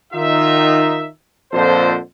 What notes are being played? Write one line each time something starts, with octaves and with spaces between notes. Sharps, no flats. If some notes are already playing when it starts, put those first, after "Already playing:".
D#3 D#4 F4 E5
F2 A#2 D3 A4 C5